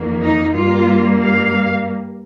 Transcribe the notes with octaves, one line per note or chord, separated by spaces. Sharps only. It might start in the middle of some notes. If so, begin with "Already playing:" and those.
Already playing: F2 D#3 A#3
D#4
G2 G3 A#3 F4
F5